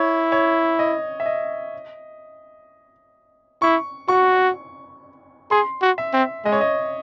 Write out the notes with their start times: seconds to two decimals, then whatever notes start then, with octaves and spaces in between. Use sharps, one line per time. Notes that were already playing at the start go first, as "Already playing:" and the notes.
Already playing: E4 C#5
0.32 C#5
0.79 D#5
1.20 E5
1.26 D#5
3.62 E4 C#6
4.08 F#4 C#6
5.51 G#4 C6
5.82 F#4
5.98 E5
6.13 C4
6.45 G#3 D#5
6.52 C#5
6.61 D#5